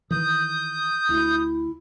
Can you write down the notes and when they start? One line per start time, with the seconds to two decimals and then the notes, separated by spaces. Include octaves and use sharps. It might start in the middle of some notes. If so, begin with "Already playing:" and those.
0.11 D#3 E3 D#6 G6
1.09 D2 E4